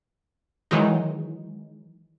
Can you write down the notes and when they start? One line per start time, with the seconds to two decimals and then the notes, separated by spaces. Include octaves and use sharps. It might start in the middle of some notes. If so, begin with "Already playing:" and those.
0.71 D#3 E3 F#3 G#3 D#4